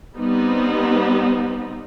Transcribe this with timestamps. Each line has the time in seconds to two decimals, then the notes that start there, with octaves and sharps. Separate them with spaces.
0.17 G3 B3 C4 D#4